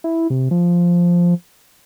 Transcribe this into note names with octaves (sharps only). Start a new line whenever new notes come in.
E4
C3
F3